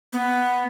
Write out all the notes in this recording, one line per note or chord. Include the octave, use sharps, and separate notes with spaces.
B3